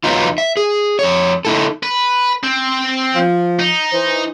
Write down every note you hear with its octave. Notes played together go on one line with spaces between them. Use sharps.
E2 F#3 B3 D#4 F4
E5
G#4
F2 C#5
D#4 E4 A4
B4
C4
F3
D#4
E3 C5